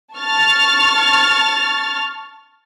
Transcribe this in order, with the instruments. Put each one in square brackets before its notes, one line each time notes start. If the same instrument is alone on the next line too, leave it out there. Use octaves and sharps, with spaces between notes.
[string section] A5 C#6 F6 A6